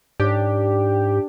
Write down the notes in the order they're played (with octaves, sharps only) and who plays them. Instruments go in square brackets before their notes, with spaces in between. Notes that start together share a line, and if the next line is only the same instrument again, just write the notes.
[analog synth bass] G#2 [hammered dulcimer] D4 [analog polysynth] G4